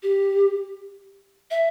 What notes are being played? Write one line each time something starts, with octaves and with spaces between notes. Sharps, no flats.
G4
E5